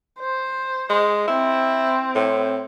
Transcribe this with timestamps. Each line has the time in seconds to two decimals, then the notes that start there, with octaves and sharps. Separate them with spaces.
0.20 C5
0.90 G#3
1.27 C4 E4
2.15 A2